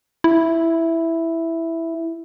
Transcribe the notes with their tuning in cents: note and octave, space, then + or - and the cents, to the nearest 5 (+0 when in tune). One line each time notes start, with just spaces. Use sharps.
E4 +0